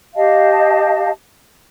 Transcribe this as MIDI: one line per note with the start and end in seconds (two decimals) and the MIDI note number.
0.15 1.11 67
0.15 1.11 75
0.15 1.11 77
0.15 1.11 81